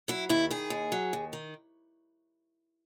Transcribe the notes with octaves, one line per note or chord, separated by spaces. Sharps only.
F#3 E4
D#2 E4
D#3 G#4
D#2
F#3
D#2
D#3